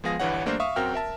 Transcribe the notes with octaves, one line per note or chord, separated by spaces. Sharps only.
F3 G#3 B3 G#4 F5 A#6
G1 G2 E3 C#5 F#5
G3 A3 A#3 D4 A#4 C5
E5 F5 C#6 D#6
F#2 C4 F#4 A#4 G5 F6
A#4 E5 A5